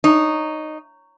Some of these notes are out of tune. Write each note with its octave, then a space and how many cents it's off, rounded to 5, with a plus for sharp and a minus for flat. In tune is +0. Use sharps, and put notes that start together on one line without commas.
D#4 -10 C#5 +10